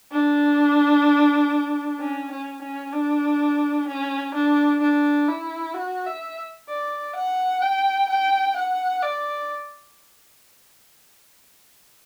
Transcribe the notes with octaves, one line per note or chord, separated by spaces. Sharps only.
D4
C#4
C#4
C#4
D4
C#4
D4
D4
E4
F#4
E5
D5
F#5
G5
G5
F#5
D5